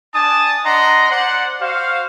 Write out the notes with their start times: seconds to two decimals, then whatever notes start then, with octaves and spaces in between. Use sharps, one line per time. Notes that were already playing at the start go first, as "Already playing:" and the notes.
0.14 D4 G#5 A5 D#6
0.65 D4 D#5 F#5 A#5 C6
1.11 C5 D5 F#5
1.61 F#4 C5 F5